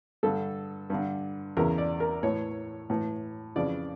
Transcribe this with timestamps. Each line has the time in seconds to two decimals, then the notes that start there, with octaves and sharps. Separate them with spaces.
0.23 G2 D3 A4
0.90 G2 D3
1.57 E2 C#3 E3 A#4
1.78 D5
2.00 A#4
2.23 A2 E3 C#5
2.90 A2 E3
3.56 F2 C#3 E3 D5